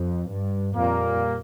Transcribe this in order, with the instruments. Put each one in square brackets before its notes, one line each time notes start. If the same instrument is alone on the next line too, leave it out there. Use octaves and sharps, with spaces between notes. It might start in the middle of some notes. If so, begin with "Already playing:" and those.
Already playing: [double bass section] F2
G2
[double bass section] F2 [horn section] A#2 G3 A#3